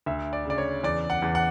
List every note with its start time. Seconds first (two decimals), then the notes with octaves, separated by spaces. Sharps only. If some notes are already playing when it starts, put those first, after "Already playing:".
0.06 D2 E5
0.33 D5
0.45 C#3 D5
0.58 C#5
0.83 E2 D5
1.10 F#5
1.22 E2
1.35 F#5